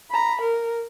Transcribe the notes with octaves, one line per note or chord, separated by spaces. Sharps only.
A#5 B5
A#4